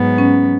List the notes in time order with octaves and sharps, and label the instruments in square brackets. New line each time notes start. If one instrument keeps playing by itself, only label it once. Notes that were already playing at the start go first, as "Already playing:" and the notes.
Already playing: [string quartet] G#2 F#3 B3
[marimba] C#4